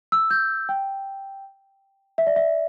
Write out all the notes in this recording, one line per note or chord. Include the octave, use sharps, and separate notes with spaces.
E6
G6
G5
E5
D5
E5